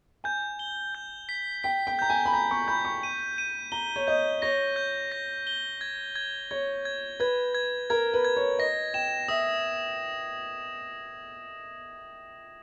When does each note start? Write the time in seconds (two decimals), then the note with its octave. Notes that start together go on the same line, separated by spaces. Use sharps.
0.24 G#5 G6
0.59 G7
0.95 G6
1.29 B6
1.64 G5 B6
1.87 G5
1.99 A#5 G6
2.10 G#5
2.26 B5
2.33 A#5 G6
2.51 C#6
2.68 B5 G6
2.85 C#6
3.03 D#7
3.38 D#7
3.72 A#5 G7
3.96 C#5
4.07 D#5 G6
4.42 C#5 A#6
4.76 G6
5.12 A#6
5.47 G7
5.81 G#6
6.16 G#6
6.51 C#5 G#6
6.85 G#6
7.20 B4 G#6
7.55 G#6
7.90 A#4 G#6
8.14 B4
8.25 G#6
8.36 C#5
8.59 D#5 A#6
8.94 G5 E7
9.28 E5 D#6